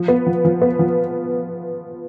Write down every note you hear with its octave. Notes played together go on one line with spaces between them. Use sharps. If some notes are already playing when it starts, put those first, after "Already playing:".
Already playing: F3
B3
F3
F3
B3
F3